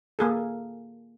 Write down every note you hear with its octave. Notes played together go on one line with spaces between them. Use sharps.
A#3 G#4 A4